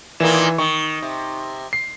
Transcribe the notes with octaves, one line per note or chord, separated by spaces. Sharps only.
A#2 D#3 E3 A#3 E7
D#3 C#6
C3
C7